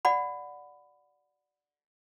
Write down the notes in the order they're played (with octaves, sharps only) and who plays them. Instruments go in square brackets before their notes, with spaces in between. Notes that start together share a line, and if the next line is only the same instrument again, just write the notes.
[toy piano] D5 F#5 B5